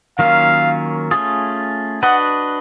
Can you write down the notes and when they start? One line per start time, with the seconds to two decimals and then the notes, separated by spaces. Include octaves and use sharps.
0.19 D#3 F#3 A#3 C#4 F4 F5
1.11 A3 C#4 F4 G#4
2.03 D4 F#4 B4 D#5 F#5